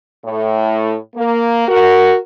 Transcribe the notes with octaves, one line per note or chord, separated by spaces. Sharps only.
A2
A#3
F#4 A#4